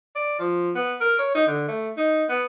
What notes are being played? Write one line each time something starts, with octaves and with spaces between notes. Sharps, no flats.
D5
F3
B3
A#4
C#5
D#4
D3
A3
D#4
B3